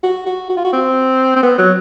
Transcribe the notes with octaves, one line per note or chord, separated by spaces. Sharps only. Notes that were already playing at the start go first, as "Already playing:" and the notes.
F#4
F#4
F#4
F4
F#4
C4
C4
B3
F#3